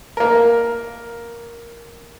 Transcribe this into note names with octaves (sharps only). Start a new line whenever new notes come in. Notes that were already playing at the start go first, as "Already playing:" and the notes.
A#3 A#4